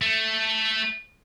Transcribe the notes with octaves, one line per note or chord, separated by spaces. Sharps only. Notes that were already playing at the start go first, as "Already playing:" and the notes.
A3